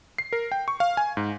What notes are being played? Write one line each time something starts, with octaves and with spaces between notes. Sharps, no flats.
C7
A#4
G5
C#6
F5
G#5
G#2